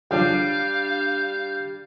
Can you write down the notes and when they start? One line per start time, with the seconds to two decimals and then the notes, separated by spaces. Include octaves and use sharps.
0.11 F#2 C#3 F3 G3 D4 F5 G6